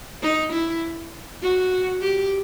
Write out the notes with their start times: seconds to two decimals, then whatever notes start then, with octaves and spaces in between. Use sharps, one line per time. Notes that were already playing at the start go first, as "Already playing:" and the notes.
0.22 D#4
0.53 E4
1.42 F#4
2.02 G4